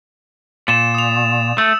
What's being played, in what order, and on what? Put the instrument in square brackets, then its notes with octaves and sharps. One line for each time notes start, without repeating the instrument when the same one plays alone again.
[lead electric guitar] A#2 [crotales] A6 E7
[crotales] D#6 F7
[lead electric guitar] A3 [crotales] E6